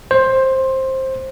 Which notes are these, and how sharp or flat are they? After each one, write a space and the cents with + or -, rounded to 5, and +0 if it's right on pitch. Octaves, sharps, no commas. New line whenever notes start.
C5 +15